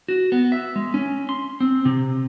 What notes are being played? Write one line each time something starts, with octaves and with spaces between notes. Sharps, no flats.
F#4
B3
E5
G#3
C#4
C6
C4
C3